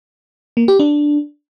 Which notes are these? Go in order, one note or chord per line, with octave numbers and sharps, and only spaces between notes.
A#3
G4
D4